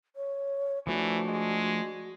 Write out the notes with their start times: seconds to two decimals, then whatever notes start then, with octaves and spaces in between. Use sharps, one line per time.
0.16 C#5
0.87 E3 F3 A3 D4 F#4
1.29 G#3